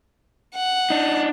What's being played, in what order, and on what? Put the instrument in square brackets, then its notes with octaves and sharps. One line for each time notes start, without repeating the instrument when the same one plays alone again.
[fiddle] F#5
[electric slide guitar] D4 D#4